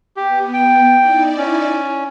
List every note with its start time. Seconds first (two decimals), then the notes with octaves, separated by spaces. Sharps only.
0.17 B3 G4
0.53 G5
0.93 D#4 E4 D5
1.38 C#4